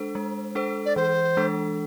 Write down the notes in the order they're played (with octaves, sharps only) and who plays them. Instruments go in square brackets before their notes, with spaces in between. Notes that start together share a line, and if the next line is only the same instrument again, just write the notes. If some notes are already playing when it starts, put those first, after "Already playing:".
Already playing: [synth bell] G#3 D4 A4 C5
G#3
D4 A4 C5
[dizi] D5
[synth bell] E3 [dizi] C5
[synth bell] G#3 D4 A4